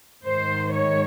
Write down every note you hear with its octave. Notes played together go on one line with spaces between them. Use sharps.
G#2 D#3 C5
C#5